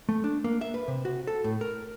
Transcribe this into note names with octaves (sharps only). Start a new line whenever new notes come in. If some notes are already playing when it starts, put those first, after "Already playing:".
A3
D4
A#3
E5
B4
C3
F#4
A4
A2
A#4